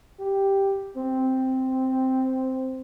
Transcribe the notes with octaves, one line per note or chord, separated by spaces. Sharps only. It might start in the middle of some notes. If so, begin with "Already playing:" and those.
G4
C4